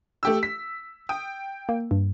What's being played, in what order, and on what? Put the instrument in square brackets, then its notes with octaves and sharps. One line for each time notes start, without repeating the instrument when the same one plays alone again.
[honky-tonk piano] A3 G4 E6
B6
[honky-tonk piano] G5 [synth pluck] D#6
[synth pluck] A#3
G2